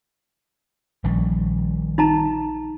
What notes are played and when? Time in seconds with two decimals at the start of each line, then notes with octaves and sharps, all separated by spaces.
1.04 A#1 D#3 G3 C#4
1.98 D#4 A5 A#5